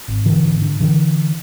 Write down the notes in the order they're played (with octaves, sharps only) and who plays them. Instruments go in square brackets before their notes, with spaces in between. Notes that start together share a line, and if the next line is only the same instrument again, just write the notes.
[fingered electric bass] G#1
G2 D3 E3
G#1
D3
D3 E3